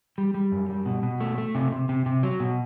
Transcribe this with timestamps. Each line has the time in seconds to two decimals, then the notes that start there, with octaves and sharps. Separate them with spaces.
0.18 G3
0.34 G3
0.52 F#2
0.69 G3
0.86 B2
1.03 B2
1.21 A3
1.38 A3
1.55 C3
1.72 C3
1.89 C3
2.06 C3
2.23 F#3
2.40 B2